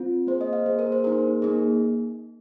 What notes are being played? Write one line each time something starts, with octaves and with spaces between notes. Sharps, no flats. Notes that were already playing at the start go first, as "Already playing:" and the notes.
Already playing: C4 F4
A#3 G#4 C5
D#5
F5
A#3 G#4 C5
A#4
C5
A#3 D#4 G#4 A#4
A#3 D#4 G#4